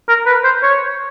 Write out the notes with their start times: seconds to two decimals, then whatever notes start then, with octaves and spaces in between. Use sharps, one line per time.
0.09 A#4
0.26 B4
0.44 C5
0.63 C#5